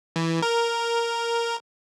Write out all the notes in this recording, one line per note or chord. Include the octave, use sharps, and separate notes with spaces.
E3
A#4